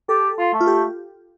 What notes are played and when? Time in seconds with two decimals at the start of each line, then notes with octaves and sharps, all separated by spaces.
0.09 G4 A4
0.38 F4
0.53 A3
0.61 F4
0.67 G4